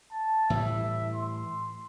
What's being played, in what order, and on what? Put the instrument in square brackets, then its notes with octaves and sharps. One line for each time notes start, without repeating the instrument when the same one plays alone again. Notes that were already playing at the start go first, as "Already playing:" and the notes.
[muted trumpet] A5
[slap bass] A2 E3 G3 [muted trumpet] E5
[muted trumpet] C6